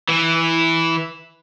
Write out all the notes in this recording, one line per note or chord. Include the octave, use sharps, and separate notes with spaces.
E3 E4